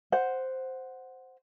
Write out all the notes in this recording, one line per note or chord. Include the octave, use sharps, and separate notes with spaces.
C5 F#5